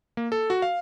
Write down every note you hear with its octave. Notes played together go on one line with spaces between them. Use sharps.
A#3
A4
F#4
F5